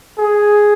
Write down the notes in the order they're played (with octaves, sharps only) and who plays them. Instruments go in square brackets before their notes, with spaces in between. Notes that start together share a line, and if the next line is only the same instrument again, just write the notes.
[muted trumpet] G#4